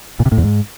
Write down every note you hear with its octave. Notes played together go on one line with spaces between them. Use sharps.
A#2
C3
A2
E2
G#2